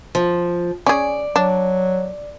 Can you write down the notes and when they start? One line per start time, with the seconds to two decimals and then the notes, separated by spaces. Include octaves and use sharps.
0.15 F3
0.86 C#4 G#4 D5
1.36 F#3 D4